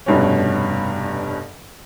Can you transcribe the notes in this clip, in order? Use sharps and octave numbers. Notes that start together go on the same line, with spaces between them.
F1 G2 B2 C#4